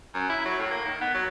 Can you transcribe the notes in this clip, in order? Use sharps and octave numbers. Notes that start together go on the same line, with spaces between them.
F#2
E4
F#3
A2
A#3
D#3
B3
F#3